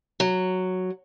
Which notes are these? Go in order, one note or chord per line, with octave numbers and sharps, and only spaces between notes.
F#3